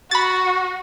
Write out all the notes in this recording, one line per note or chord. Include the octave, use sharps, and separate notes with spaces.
F#4 B5 A6